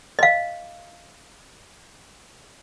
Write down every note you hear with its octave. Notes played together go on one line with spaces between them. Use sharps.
D#5 F5